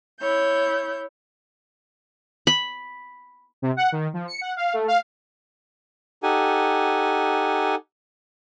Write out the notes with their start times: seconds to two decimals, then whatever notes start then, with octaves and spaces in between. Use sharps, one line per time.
0.19 E4 C#5 G6
2.47 B5
3.62 C3
3.77 F#5
3.92 D#3
4.14 F3
4.28 C#7
4.41 F#5
4.56 F5
4.73 A3
4.88 F5
6.23 D#4 G4 A4 F#5 G#5